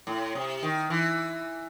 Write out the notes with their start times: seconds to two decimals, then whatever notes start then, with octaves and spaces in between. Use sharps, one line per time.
0.07 A2
0.35 C3
0.63 D#3
0.90 E3